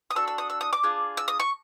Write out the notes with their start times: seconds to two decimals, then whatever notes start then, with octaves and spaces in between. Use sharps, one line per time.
0.11 D#6
0.15 D4 F#4 A4 E6
0.28 E6
0.38 D#6
0.50 E6
0.61 D#6
0.73 D6
0.83 D4 F4 G#4
1.17 E6
1.28 D#6
1.40 C#6